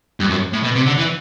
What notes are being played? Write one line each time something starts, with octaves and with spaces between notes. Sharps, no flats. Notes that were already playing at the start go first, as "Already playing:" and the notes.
G2
F#2
A2
B2
C3
D3
E3